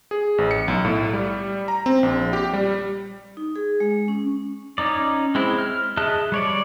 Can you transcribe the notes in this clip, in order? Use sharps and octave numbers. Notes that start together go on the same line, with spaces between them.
G#4
A1
C#7
B1
A2
G3
A#5
C4
A#1
G4
G3
D#4
G#4
G#3
C#4
C#4 D#4 D5
G#3 C4 E4
F6
G#4 D#5 E5 A5 F#6
G3 C#5 D5